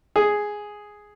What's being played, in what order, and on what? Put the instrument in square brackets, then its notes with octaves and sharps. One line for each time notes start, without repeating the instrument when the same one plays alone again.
[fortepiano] G#4